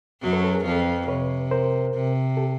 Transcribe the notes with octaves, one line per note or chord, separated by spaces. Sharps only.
F#2 F#3
A4 B4
A4 B4
G#4 A#4
F2 F3 A4 B4
C3 B4 C#5
A#4 C5
C3
G4 A4